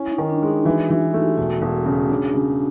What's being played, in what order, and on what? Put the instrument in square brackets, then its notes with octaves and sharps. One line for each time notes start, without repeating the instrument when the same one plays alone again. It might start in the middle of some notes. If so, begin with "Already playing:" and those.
Already playing: [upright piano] C#4 [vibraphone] E4
[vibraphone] D#4
[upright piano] D#3
[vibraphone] D4
[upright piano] G#3
[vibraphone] D#4
[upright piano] E3 [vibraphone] F#4
[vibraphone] F#4
[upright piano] E3
[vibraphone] F#4
[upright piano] A3
[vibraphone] G4
[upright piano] E1 [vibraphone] F#4
[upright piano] E1
C#3
[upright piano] C#3 [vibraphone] D4
[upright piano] C#3